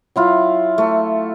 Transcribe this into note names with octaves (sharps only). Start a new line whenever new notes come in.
F#3 E4 F4
A3